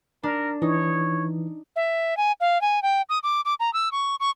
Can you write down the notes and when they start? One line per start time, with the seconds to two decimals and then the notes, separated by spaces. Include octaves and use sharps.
0.23 D4 A#4
0.62 E3 D#4 C#5
1.76 E5
2.17 G#5
2.41 F5
2.61 G#5
2.83 G5
3.09 D#6
3.23 D6
3.45 D6
3.60 A#5
3.73 E6
3.92 C#6
4.20 C#6